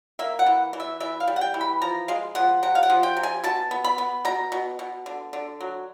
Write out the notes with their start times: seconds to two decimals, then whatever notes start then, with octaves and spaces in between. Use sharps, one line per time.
0.19 A#3 E5
0.39 F#5
0.46 E3
0.73 E3
0.80 E5
1.00 E3 E5
1.20 F5
1.27 G3
1.36 F#5
1.41 G5
1.54 E3
1.61 B5
1.82 F3 A#5
2.08 G#3 F5
2.35 F3 F#5
2.63 C3 F#5
2.75 F5
2.83 F#5
2.90 F3
3.03 G5
3.17 C3
3.23 G#5
3.44 B2 A5
3.71 B3
3.84 B5
3.98 B3
4.25 B2 A#5
4.52 B2
4.79 B2
5.06 D3
5.33 D3
5.61 F#3